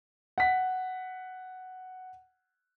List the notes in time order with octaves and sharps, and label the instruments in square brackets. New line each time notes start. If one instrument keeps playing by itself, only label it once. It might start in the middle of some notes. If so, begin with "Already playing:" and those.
[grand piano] F#5 B6